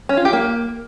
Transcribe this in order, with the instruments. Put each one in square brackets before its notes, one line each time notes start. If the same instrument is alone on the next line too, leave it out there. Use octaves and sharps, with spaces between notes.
[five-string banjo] C#4
F4
G4
A#3